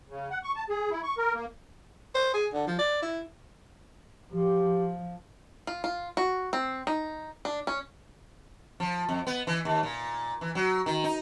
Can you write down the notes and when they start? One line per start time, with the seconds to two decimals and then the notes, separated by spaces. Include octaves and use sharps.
0.09 C#3
0.31 F#5
0.43 C#6
0.56 A5
0.69 G#4
0.91 E4
1.03 C#6
1.18 A#4
1.34 A#3
2.15 C5
2.34 G#4
2.53 D3
2.67 F3
2.79 D5
3.02 E4
4.32 F3 G4
5.67 F4
5.84 F4
6.17 F#4
6.53 C4
6.87 D#4
7.45 D4
7.67 C#4
8.80 F3
9.09 F2
9.27 B3
9.47 E3
9.65 D#2
9.83 A#2
10.41 E3
10.55 F#3
10.86 D#3
11.04 D#4